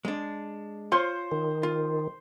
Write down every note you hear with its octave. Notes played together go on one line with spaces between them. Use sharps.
G#3 D4
F4 C5 C#5 C6
D#3
F4